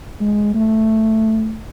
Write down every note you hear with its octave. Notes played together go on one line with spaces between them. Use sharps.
G#3
A3